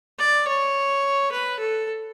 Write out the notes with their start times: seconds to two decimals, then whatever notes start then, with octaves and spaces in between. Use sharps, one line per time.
0.19 D5
0.47 C#5
1.32 B4
1.59 A4